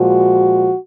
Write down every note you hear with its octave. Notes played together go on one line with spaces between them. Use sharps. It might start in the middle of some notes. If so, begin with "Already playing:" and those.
Already playing: A#2 F3 G#3 F#4